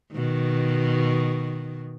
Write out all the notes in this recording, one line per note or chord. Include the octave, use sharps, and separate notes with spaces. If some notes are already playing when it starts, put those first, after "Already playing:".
B2 D#3